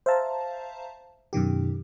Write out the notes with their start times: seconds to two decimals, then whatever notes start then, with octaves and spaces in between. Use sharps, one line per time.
0.06 C5 E5 F5 A5 A#5
1.33 F#2 B2 D#3 G4